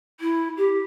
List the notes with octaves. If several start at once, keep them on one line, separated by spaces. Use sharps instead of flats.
E4
G4